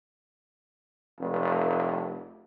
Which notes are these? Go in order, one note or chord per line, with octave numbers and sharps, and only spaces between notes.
F1